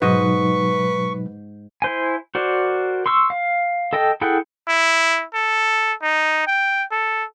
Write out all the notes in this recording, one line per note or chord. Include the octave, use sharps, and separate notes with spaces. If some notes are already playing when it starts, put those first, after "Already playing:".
G#2 B2 F#3 D#4 B4 D#5 C#6
E4 C5 G#5
F#4 A#4 C5 D5
C6 C#6 E6
F5
A4 D#5 G5
E4 G#4 A4 F#5 G5
E4
A4
D#4
G5
A4